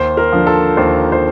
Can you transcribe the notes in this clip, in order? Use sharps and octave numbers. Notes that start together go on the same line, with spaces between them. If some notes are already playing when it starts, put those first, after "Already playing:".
Already playing: D#2 C5
A#4
D3 F3
A4
D#2 C5
C5